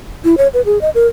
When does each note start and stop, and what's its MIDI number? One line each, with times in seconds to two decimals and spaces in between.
0.24 0.35 64
0.38 0.48 73
0.54 0.61 71
0.65 0.81 68
0.81 0.90 75
0.95 1.07 70